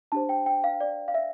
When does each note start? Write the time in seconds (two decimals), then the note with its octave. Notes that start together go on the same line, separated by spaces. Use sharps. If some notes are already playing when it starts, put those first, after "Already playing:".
0.12 D4 G4 C5 A5
0.29 G5
0.46 G5
0.64 F5
0.80 D5
1.08 F5
1.14 E5